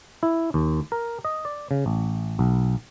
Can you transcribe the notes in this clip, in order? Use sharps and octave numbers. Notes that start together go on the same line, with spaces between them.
E4
D#2
A#4
D#5
D5
C#3
A1
B1